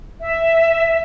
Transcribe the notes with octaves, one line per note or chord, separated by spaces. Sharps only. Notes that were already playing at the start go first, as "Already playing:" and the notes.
E5